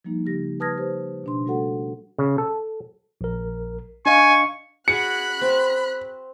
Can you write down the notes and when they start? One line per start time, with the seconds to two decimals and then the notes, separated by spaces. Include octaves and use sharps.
0.05 F3 G3 A#3 D#4
0.26 C#3 G4 A#6
0.60 B4 A5 D#6 F6 G#6 A#6
0.78 G4 B4 C5
1.24 B2 D4 C6
1.46 G3 A3 F#4 A4 F#5
2.18 C#3
2.38 A4
3.21 A#1 A#4
4.06 D4 D#5 F5 G#5 C#6
4.88 F#4 G#4 B5 F#6 C#7
5.41 C4